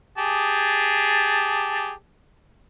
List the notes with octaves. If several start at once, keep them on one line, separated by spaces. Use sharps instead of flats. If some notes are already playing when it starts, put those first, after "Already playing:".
G4 G#4 A5